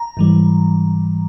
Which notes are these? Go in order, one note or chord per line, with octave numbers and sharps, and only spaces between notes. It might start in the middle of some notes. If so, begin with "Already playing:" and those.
Already playing: A#5
G#2 E3 G3